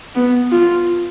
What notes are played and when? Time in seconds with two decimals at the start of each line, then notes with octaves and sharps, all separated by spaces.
0.15 B3
0.52 F4